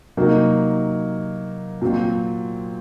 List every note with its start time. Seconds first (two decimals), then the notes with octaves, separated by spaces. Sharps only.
0.17 C3 F#3 A#3 D#4
1.82 A#2 F#3 C4